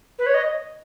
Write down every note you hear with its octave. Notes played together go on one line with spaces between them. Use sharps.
B4
C#5
D#5